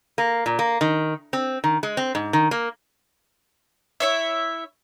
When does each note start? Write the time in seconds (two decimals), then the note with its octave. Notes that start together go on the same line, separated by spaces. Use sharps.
0.18 A#3
0.46 A#2
0.59 A#3
0.81 D#3
1.33 C4
1.64 D#3
1.83 G#3
1.97 C4
2.15 G#2
2.33 D#3
2.51 A#3
4.00 E4 C#5 E5